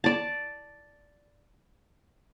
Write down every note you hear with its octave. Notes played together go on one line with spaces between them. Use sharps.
D5 A5